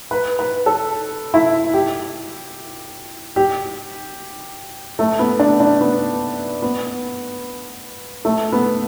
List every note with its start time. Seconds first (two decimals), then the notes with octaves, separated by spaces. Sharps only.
0.11 B4
0.39 B4
0.66 A4
1.34 E4
1.74 G4
3.36 G4
4.99 A3
5.19 B3
5.39 D4
5.60 D4
5.81 B3
6.62 B3
8.25 A3
8.52 B3